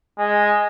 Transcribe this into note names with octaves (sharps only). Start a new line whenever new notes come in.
G#3